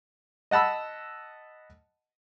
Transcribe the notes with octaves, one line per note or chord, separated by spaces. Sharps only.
D#5 F#5 A5 B5 E6